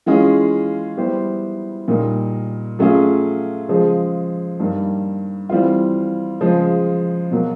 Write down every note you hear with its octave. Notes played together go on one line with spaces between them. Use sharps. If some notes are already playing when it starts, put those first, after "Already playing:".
E3 G#3 C#4 F4 G#4
G3 B3 E4 G4 C5
A#2 G3 A#3 D#4
F#3 A3 C#4 F4 G#4
C#3 F3 G#3
G2 D#3 G3 A#3
E3 G3 C4 F4
C#3 F3 G#3
B2 F#3 A#3